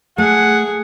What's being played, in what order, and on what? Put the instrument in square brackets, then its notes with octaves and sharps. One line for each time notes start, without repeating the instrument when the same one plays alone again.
[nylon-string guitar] A3 [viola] G#4 [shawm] F#5